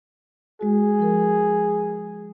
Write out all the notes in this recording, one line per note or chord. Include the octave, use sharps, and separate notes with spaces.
G#3 F#4 G#4
F3 A#4